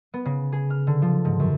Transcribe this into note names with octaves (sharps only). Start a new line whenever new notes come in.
B3
C#3
G#4
F6
D3
F3
G#2
F#2